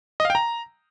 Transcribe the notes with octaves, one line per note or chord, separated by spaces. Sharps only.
D#5
F5
G5
A#5